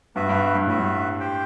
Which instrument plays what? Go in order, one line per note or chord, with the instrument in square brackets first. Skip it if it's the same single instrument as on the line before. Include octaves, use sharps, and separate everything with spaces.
[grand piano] G2 [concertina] B3 F#4 B4 E5
[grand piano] G2
G2
[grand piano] A2 [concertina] B3 F#4 B4 E5
[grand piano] G2
[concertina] G4 C5 G5